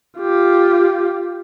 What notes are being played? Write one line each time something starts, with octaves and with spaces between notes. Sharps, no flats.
F4 G4